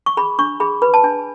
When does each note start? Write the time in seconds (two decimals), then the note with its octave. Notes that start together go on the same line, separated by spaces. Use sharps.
0.06 C#6
0.17 G#4 B5
0.39 D4 C#6
0.60 G#4 B5
0.82 B4 B5
0.94 A5
1.03 D4 G#5